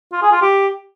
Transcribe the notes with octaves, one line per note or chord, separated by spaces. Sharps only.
F4
G#4
F4
G4